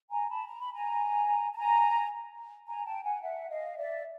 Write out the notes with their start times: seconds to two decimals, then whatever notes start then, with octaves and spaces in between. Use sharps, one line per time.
0.11 G#5 A#5
0.29 A5 B5
0.47 A#5
0.61 B5
0.73 G#5 A#5
1.53 A5
1.57 G#5 A#5
2.67 G#5 A#5
2.85 G5 A5
3.04 F#5 G#5
3.22 E5 F#5
3.50 D#5 F5
3.77 D5 E5